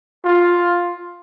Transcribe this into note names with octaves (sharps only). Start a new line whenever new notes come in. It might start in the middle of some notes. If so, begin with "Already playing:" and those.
F4